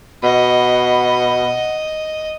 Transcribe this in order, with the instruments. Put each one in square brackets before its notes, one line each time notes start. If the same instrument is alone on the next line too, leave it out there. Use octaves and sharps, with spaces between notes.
[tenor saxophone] B2 [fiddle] D#5 [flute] F#5 [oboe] B5